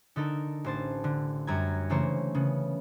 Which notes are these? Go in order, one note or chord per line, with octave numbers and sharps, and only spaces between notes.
D3 D#4 A4 A#4
A1 C5 A5
D3
F#2 F#3 G3 A#5 G#6
C#3 E3 A3 A#3 C5 C#5
C#3 B3